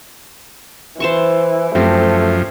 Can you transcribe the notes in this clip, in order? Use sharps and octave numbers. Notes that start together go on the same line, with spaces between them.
E3 C5 A5 C#6
F#2 F3 A3 C4 G4